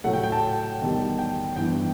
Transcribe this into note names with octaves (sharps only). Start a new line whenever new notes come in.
A2 F#3 A3 F#5
G5
G5
A5
E2 D#3 G3
G5
G2 E3 B3 G5